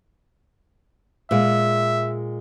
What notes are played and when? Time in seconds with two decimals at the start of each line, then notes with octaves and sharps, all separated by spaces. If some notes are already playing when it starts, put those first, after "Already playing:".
1.31 A#2 G#3 E5